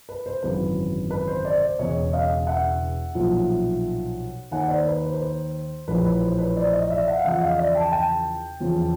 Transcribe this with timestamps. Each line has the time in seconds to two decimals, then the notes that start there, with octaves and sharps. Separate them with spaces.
0.09 B4
0.26 C5
0.43 G#1 F#2 C#3 E3 B4
1.11 B4
1.28 C5
1.44 C5 D5
1.62 C5 D5
1.78 E1 E2 C#3 C#5 D#5
2.13 D#5 F5
2.47 E5 F#5
3.15 B1 A#2 F3
4.51 D#2 D#3 F#5 G#5
4.68 C5 D5
4.79 C5
4.86 B4
5.03 C5
5.14 B4
5.20 C5
5.88 A#1 A2 E3 B4
6.05 B4
6.22 C5
6.39 B4 C#5
6.56 C5 D5
6.73 C#5 D#5
6.90 D5 E5
7.07 E5 F#5
7.17 F5
7.24 E2 C#3 F3 E5 F#5
7.40 D#5 F5
7.58 D5 E5
7.75 G5 A5
7.92 G5 A5
8.60 E2 C#3 F3